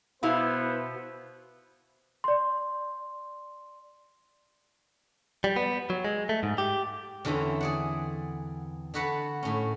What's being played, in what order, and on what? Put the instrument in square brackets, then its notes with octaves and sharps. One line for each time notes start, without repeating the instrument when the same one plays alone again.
[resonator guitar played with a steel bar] B2 E4 F5 [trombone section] B3 C5
[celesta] D5 C6
[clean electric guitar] G3
B3
F#3
G#3
A3
G#2
G4
[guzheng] E2 D3 E3 C4 C#4
G#4 D5 F#5
D3 B3 F#4 B4 F#5 A5
A2 C#4